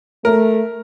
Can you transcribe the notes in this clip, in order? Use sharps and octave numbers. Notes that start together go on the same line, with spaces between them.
A3 A#4